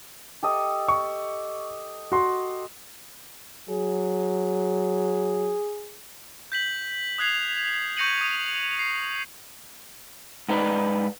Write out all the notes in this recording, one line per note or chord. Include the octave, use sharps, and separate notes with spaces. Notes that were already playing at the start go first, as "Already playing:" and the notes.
G4 A4 D#5
C#6
F#4 C6
F#3 G#4
G6 B6 F#7
D#6 F#6 G#6 C7 F7
C#6 G6 A#6 C#7 D#7 F#7
D#6 D#7
C7
G#2 B3 D#4 A#4 B4 D5